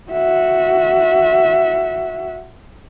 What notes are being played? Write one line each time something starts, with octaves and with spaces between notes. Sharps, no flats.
F#4 E5